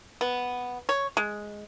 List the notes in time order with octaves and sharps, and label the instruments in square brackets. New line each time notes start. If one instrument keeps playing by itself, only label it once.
[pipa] B3
C#5
G#3